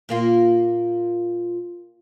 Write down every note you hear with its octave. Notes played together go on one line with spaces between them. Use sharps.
A#2 A#3 F4